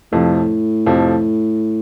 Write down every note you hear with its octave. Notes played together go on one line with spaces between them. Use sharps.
F2 A2 C3 F3
F2 C3 F3